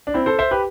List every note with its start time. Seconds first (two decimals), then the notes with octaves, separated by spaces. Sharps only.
0.07 D4
0.14 C4 E4
0.26 A4 C5
0.39 C5 E5
0.51 G4 B4